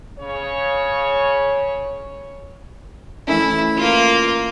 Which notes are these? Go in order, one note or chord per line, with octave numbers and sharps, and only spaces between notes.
C#3 C#5
E3 A3 C#4 E4
A#3 F4